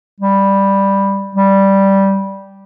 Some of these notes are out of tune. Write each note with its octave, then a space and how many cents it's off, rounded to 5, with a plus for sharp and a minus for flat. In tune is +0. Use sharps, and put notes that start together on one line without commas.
G3 +5
G3 -5